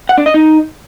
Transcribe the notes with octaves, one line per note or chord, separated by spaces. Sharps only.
F#5
D4
D#5
D#4